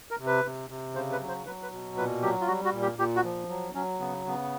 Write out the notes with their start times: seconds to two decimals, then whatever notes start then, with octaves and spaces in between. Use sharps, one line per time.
0.11 A#4
0.19 C3
0.26 B4
0.45 C3
0.70 C3
0.94 C#3 C5
1.12 B4
1.20 F#3
1.28 C5
1.46 F#3 B4
1.63 B4
1.72 B2
1.97 A#2 B4
2.22 F#3 G4
2.41 F4
2.47 G3 F#4
2.65 F#4
2.73 A#2
2.82 G4
2.98 A#2 G4
3.16 F#4
3.24 F3
3.49 F#3
3.75 F#3 C#4
4.00 C#3 B3
4.26 C#3 B3